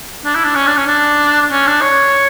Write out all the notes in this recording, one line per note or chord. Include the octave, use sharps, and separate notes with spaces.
D4
E4
D4
C#4
D4
C#4
D4
C#4
D4
C#5